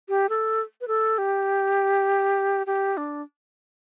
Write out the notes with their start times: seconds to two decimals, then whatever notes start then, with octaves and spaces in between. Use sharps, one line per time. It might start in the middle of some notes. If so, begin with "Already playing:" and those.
0.09 G4
0.29 A4
0.81 B4
0.88 A4
1.18 G4
2.67 G4
2.97 D4